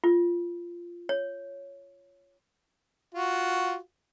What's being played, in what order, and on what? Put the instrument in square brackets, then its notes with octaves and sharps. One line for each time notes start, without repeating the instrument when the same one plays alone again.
[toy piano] F4
C#5
[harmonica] F4 F#4